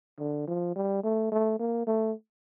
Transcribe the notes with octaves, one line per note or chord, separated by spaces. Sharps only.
D3
F3
G3
A3
A3
A#3
A3